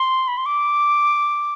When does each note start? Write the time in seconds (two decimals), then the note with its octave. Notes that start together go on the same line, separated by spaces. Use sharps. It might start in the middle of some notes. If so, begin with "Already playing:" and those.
Already playing: C6
0.28 B5
0.37 C6
0.46 D6